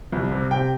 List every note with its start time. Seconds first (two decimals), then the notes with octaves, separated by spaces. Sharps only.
0.12 C2
0.32 C3
0.51 C3 G5